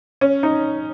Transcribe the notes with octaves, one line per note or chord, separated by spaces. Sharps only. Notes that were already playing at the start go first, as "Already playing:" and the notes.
C#4
D#4